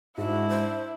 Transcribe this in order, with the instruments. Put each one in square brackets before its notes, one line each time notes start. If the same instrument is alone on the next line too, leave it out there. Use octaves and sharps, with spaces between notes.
[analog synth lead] G#2 [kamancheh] D4 E4 [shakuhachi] F#4
[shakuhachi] C5